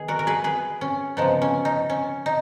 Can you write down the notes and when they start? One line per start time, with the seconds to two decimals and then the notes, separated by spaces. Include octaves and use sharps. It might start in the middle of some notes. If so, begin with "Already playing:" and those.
Already playing: D#3 B3 G#4
0.08 F#4 A#4
0.19 A#4
0.27 G#4 B4
0.44 G#4 B4
0.81 C#4
1.17 C#3 F3 B3 D#4
1.42 C#4
1.65 D#4
1.90 C#4
2.26 D#4